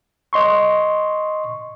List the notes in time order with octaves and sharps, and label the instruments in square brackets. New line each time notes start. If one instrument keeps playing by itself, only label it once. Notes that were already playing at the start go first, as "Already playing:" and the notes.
[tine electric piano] D#5 C6 C#6